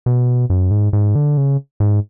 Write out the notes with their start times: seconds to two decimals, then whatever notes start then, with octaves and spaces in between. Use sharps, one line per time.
0.06 B2
0.50 F#2
0.71 G#2
0.93 G#2
1.15 D3
1.37 C#3
1.80 G#2